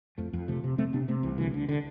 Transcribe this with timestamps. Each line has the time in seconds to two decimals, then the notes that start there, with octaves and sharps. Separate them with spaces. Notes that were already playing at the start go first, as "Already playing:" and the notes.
0.18 F2 F3 A3
0.33 F2
0.48 C3 F3 A3
0.64 C3
0.78 C3 A3 C4
0.93 C3 B3 D4
1.08 C3 A3 C4
1.23 C2 E3
1.38 D2 E3
1.54 D3
1.69 D3